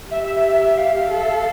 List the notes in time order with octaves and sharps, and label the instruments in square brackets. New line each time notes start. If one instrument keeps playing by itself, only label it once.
[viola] G4 [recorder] E5
[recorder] E5
E5
E5
E5
F5
F5
[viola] A4 [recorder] E5
[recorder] E5
F5